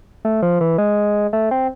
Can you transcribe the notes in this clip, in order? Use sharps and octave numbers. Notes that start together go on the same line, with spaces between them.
A3
F3
E3
G#3
A3
C4